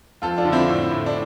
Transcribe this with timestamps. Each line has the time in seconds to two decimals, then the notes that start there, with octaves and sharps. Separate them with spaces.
0.22 F2 F4 A4
0.37 D4 F4
0.45 D3
0.52 C4 E4
0.68 A2
0.91 A2
1.06 D4